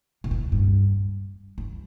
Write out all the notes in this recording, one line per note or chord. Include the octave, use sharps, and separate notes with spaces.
C3
A#2
G2
G2